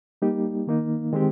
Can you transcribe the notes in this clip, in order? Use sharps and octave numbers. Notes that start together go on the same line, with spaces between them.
G3 A#3 D#4 G4
D#3 A#3 D#4
D#3 G#3 C4 G4